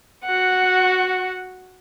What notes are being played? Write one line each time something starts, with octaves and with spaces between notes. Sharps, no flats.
F#4 F#5